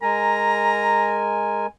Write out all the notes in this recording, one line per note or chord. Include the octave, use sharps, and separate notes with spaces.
G#3 A#4 G#5 A#5